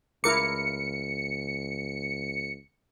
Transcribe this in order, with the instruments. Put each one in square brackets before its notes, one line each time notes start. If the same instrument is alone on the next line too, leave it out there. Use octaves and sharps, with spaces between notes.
[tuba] C#2 [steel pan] E4 A#4 D6 [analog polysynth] C#7